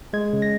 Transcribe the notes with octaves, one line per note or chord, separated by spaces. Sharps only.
G#3 G#6
C#3
A#6